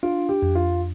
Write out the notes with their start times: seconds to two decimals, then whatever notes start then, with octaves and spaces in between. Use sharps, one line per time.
0.03 D4 F4
0.29 G4
0.42 F2
0.55 F4